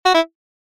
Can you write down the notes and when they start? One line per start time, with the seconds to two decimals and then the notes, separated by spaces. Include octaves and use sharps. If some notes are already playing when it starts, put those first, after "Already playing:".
0.05 F#4
0.14 E4